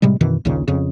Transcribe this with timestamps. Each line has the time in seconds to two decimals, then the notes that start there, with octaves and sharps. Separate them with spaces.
0.02 A2 C3 G3 G#3
0.21 F#2 B2 D#3 E3
0.45 A#1 D#2 A#2 C#3
0.68 F2 C#3